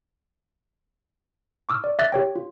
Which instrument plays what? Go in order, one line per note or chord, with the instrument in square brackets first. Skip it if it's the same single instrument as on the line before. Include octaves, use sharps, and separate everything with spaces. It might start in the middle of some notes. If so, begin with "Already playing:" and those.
[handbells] C#6 D6 E6 F6
D5
E5 D6 F#6 A6 A#6
G4 C#5 G5
F4